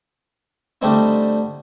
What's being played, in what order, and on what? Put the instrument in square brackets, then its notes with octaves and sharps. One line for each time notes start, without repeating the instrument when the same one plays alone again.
[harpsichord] D3 G3 A3 C4 D#4 E4